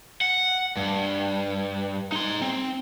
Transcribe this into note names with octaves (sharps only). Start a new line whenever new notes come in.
F#5
G2
D#4 C6
C4